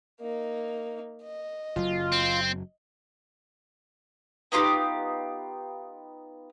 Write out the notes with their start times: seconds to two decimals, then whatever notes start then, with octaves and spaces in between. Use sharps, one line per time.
0.20 A#3 D#4
1.23 D#5
1.76 F#1 F#3 F4
2.12 C4
4.52 B3 D#4 F4 G4